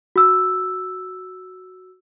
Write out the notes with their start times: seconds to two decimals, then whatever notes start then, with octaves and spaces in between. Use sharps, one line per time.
0.16 F#4 E6